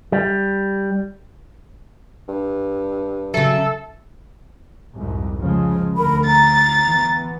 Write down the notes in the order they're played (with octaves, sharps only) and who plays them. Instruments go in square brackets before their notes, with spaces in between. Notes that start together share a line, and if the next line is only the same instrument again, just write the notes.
[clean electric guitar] G3
[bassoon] G2
[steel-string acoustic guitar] C#3 F#3 [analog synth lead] A4 [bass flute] E5
[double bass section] C2 F2 G#2
C#3 F3 G#3
[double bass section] D2 [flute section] A#4 B5
[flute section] A#5 [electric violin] A6
[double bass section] E3 B3